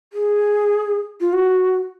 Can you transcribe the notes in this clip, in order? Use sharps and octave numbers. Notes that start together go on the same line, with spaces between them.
G#4
F4
F#4